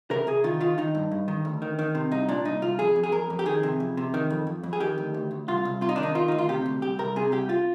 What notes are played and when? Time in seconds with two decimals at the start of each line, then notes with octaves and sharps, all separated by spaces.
0.11 C3 A#4
0.27 C3 G#4
0.44 D#3 F4
0.61 D#3 F4
0.78 D#3 D#4
0.95 G2
1.11 G2
1.28 D#3
1.45 D2
1.62 D#3
1.79 D#3
1.95 C3
2.11 C2 D#4
2.28 A#2 D4
2.45 C2 D#4
2.62 C2 F4
2.79 F2 G#4
2.96 F2
3.04 G#4
3.12 F2 A#4
3.30 F2
3.39 G4
3.46 D#3 G#4
3.63 C3
3.80 F2
3.97 C3
4.14 D#3
4.30 F2
4.47 F2
4.63 F2
4.73 G#4
4.80 D#3 G4
4.98 D2
5.14 D2
5.31 D2
5.48 C2 F4
5.65 C2
5.81 C3 F4
5.89 D#4
5.96 D#3 D4
6.03 D#4
6.15 D#3 F4
6.28 D2 D#4
6.38 F4
6.49 C3 G4
6.66 D2
6.82 C2 G4
6.99 C2 A#4
7.16 C3 G#4
7.32 C2 G4
7.49 F4